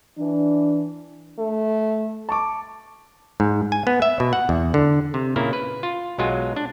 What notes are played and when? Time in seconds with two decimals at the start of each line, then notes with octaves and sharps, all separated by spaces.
0.18 E3 D4
1.38 A3
2.29 A5 C#6 D6
3.40 G#2
3.72 G#5
3.87 B3
4.02 E5
4.20 B2
4.33 F#5
4.49 E2
4.74 D3
5.14 C3
5.36 A#2 C#3 A#3 E4
5.53 B4
5.83 F4
6.18 B1 F#3 G#3 F4 F#4 G#5
6.56 D4